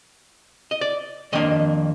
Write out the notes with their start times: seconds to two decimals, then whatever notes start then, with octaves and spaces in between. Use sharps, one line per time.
0.71 D#5
0.81 D5
1.32 F2 D#3 A#3 D4 D#5